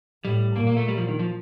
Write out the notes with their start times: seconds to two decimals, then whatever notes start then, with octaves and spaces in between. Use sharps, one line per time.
0.24 A2 G3
0.56 A#2 A#3
0.67 A#3
0.77 A3
0.88 G3
0.98 F3
1.08 D#3
1.19 F3